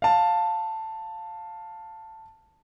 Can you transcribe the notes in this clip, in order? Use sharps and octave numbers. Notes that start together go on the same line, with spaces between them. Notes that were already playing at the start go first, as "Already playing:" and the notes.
F5 A5